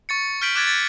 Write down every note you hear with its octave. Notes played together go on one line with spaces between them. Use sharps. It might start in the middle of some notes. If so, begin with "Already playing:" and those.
C#6 A6 C#7
F6 G6 B6 D7 F#7
D6 F#6 G#6 A6 B6 D7
A6